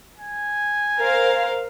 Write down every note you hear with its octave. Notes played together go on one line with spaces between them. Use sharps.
G#5
A#4 C5 F5